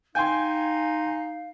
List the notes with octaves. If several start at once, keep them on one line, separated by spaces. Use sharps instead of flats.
D#4 F5 G5 G#5 C6 G6